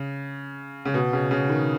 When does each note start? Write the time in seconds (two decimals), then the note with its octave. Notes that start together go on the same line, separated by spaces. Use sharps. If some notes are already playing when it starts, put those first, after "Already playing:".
Already playing: C#3
0.85 C#3
0.94 B2
1.13 C#3
1.31 C#3
1.50 D#3